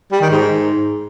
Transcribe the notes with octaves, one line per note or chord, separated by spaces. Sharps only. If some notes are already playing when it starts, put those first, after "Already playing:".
G3
D#3
G#2